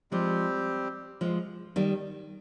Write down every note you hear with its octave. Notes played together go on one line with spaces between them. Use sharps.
F3 G3 G#3 C4 G4
F3 G#3
D#3 G3